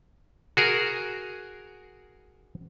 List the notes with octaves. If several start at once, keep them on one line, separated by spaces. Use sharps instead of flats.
F#4 G#4 A#4